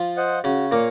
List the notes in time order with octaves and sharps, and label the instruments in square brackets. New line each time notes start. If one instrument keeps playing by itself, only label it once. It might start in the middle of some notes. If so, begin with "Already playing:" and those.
Already playing: [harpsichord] F3 F4
[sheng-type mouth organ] C5 D#5 F#5
[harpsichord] C#3 C#4 [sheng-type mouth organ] F#4
[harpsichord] A#2 A#3 [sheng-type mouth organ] C#5 F5